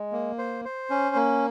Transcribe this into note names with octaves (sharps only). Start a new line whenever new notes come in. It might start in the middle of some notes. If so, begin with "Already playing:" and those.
Already playing: G#3
A#3
C5
C5
C#4
A#3